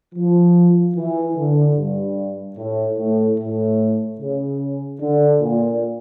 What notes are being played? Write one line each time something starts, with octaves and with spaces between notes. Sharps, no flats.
F3
E3
D3
G2
A2
A2
A2
C#3
D3
A#2